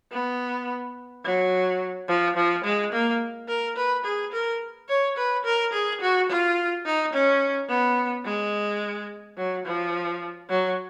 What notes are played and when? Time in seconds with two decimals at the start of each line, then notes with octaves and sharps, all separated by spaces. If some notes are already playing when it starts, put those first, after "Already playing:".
0.12 B3
1.24 F#3
2.08 F3
2.36 F3
2.64 G#3
2.93 A#3
3.48 A#4
3.76 B4
4.05 G#4
4.32 A#4
4.89 C#5
5.17 B4
5.45 A#4
5.73 G#4
6.01 F#4
6.29 F4
6.86 D#4
7.13 C#4
7.69 B3
8.25 G#3
9.37 F#3
9.65 F3
10.50 F#3